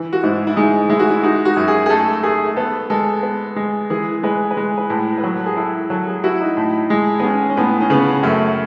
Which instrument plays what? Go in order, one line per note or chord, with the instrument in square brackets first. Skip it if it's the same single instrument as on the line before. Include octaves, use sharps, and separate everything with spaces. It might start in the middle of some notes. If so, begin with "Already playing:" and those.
Already playing: [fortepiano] E3
[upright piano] F#4
[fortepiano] G#2 [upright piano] E4
[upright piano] E4
[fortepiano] G#3 [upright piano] D#4
[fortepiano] G#3 [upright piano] E4
[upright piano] F#4
E4
[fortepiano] D#4 [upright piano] F#4
[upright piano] F#4
[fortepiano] F#2
[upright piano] G#4
G#4
[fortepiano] A3 [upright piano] A4
[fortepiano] A3 [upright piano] G#4
[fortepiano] B3 [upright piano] A4
[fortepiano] G#3 [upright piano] A4
[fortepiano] B3
G#3
[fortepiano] E3 [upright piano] G#4
[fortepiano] G#3 [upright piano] B4
[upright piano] B4
[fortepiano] G#3
[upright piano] B4
[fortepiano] A2
[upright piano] B4
[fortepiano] F#3 [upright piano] A4
[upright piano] G#4
[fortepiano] E4 [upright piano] A4
[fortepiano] F#3 [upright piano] A4
[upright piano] G#4
[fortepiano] E4 [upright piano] F#4
[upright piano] D#4
[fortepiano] A2
G#3
[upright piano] B3
[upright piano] C#4 [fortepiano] G#4
[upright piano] C#4
[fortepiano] A2 [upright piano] B3
[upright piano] C#4
[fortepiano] C#3 [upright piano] B3
[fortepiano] F#2 [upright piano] A3